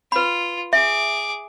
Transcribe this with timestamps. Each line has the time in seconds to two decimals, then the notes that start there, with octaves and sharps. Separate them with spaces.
0.12 F4 B4 B5
0.73 G#4 E5 D6